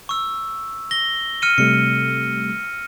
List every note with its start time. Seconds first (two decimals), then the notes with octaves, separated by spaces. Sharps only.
0.09 C#6 E6
0.91 A#6 G7
1.42 F6 C#7 D#7
1.58 C3 G3 A3 C#7